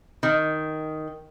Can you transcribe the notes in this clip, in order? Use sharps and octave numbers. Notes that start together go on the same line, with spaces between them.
D#3